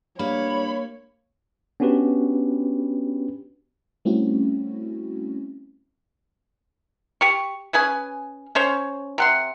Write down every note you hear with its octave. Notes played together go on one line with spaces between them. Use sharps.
G2 A#3 C#5 B5
B3 C#4 D4 F#4 G4 B4
G3 A3 C4 C#4 E4 F#4
G4 C#6
C#4 G#4 B4 G#5
C#4 C5 C#5
C3 F#5 C6